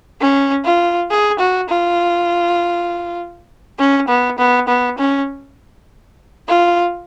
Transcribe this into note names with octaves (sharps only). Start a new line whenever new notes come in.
C#4
F4
G#4
F#4
F4
C#4
B3
B3
B3
C#4
F4